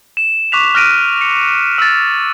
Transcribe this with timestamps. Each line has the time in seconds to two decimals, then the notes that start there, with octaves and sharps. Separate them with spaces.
0.17 E7
0.52 C#6 D6 F#6 B6 F7
0.75 F6 F#6 A#6 D7 D#7
1.21 C#7
1.78 E6 A6